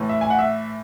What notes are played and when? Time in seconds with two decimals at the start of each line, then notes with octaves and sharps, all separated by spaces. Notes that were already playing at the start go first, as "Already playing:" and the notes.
Already playing: A2 E3 A3
0.09 E5
0.21 G#5
0.30 F#5
0.39 E5